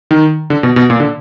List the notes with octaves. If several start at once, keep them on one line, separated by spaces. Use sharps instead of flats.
D#3
D3
B2
B2
A#2
D3